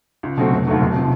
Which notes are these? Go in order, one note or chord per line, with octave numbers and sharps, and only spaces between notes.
C#2
B2 F#3 A3 C4
F1
D#2 D#3 F#3 A3
E1
C3 F3